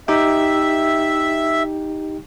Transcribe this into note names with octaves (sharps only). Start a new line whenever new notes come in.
D#4 G4 E5 G5